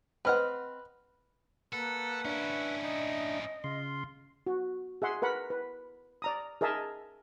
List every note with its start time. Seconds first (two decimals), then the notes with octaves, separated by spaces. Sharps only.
0.25 C4 B4 D#5 F#5 F6
1.73 A#3 A4 B4 F#5
2.25 C#4 D4 E4 E5
2.83 D#4 D#5
3.64 C#3 F4 C6
4.47 F#4
5.02 G#4 E5 F#5 C6
5.22 A#4 B4 F#5 B5
5.50 B4
6.22 D5 A#5 D#6
6.61 G#4 A#4 D#5 E5 A5